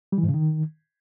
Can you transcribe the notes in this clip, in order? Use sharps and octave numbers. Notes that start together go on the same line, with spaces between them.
G3
E3
G#2
C#3
D#3